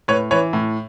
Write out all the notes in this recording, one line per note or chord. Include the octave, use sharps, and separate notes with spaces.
A2 B4 C#5
E3 B4 C#5
A2